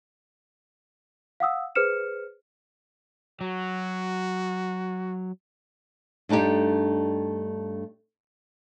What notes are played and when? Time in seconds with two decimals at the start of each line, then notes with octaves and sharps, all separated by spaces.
1.40 F5 F#5 D#6 E6
1.75 G#4 B4 C5 F6 C#7 E7
3.41 F#3 F#4
6.29 G2 A3 D4 D#4 G4